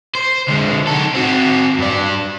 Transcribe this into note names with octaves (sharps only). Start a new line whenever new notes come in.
C5
D3 G#3
D#4 A4
C4 F#4
G2 D5